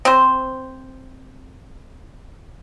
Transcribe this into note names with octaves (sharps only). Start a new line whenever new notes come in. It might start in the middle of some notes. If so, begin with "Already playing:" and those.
C4 C5